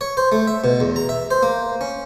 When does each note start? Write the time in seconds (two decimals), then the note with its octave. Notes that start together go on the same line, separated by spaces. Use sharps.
0.01 C#5
0.17 C5
0.32 A3
0.47 E5
0.64 B2
0.80 E2
0.96 A#5
1.09 E5
1.31 C5
1.43 A#3
1.81 C#4